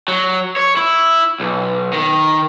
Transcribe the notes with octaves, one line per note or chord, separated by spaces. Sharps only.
F#3
C#5
E4
B1
D#3